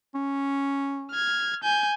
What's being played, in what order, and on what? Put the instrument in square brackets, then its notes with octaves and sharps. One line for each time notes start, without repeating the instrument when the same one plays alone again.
[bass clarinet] C#4
[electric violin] F6 G#6
G#5 G6